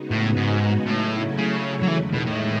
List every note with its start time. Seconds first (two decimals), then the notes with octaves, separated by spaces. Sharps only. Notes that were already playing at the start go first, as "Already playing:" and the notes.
Already playing: C#3 G#3 B3 D#4 F#4
0.11 A2
0.37 G#2
0.87 A2 C#3 F#3 A3 C#4 E4
1.38 C#3
1.83 F#3
1.88 E2 D#3 E3 G#3 D#4
2.14 B2
2.27 A2